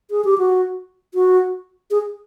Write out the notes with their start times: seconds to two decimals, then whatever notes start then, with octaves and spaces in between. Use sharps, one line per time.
0.11 G#4
0.25 G4
0.38 F#4
1.14 F#4
1.91 G#4